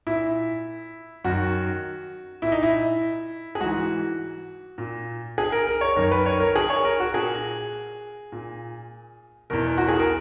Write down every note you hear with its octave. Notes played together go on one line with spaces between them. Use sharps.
A#2 E4
F#2 D#3 F#4
A#2 E4
D#4
E4
G#4
G#2 E3 F#4
A#2
G#4
A#4
A#4
C#5
F#2 D#3 A#4
B4
C#5
A#4
G#4
C#5
A#4
F#4
A#2 G#4
A#2
E2 B2 A#4
F#4
G#4
A#4